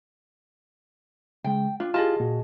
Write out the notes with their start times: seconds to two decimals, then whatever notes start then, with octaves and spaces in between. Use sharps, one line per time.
1.44 C#3 G#3 G5
1.80 D4 F4
1.94 E4 F4 G4 G#4 D#5 A5
2.20 A#2 F#4